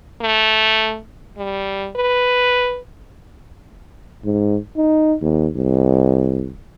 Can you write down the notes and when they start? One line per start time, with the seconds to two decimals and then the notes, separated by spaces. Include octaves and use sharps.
0.21 A3
1.37 G3
1.96 B4
4.25 G#2
4.77 D#4
5.22 D#2
5.56 C2